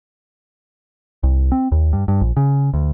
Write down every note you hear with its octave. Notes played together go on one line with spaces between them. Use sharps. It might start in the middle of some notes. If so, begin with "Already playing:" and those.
C2
C4
D#2
G2
G2
A#1
C#3
D2